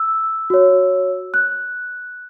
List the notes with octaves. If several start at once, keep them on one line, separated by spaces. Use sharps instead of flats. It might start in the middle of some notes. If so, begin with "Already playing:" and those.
Already playing: E6
F#4 C#5
F#6